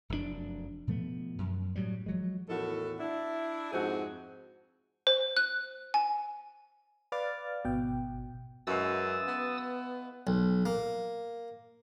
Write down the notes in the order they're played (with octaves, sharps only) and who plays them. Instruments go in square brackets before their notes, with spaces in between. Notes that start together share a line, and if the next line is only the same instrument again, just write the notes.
[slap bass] F1 F#2 A2 D4
B2 F3 A3 B3
F#2
A2 F#3 G3
F3 F#3 G#3
[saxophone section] E2 A2 D#3 F#4 A4
D4 E4
F2 G#2 C4 F#4 G#4
[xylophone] C5
F#6
G#5
[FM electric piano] B4 D5 F5 D6 F6 A6
G#1 B2 G5
[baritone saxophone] F#2 [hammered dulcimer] E3 G#3 F5 [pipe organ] D#6 E6 A6
[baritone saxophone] B3
[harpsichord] B1
A#3